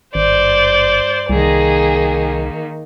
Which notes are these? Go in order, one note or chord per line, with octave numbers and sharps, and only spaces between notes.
G#1 G2 C5 D5 G6
C2 D#3 A#3 G#4